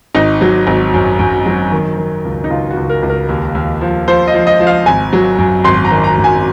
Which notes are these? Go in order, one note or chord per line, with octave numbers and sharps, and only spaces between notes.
G#1 D#4
F#3
G#1
F#2
F#2
F#3
D#3
D#3
C#2
D#4
C#2 F4
F#4
C#2
A#4
C#2
A#4
D#2
D#2
F3
F3 C5
D#5
F3
D#5
F3
F5
G#1 G#5
F#3
F#2
G#1 C6
A#5
D#3
A#5
F#2
G#5